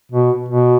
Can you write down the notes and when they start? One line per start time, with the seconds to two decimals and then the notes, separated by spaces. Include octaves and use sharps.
0.12 B2
0.49 B2